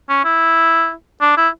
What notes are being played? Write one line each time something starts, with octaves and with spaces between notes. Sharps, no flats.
C#4
E4
D4
E4